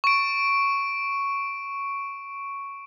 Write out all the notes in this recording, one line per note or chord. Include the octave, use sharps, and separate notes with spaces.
C#6 D7